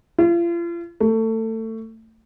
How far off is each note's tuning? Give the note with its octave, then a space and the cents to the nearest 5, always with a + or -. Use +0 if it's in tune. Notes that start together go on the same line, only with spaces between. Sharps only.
F4 -40
A3 +25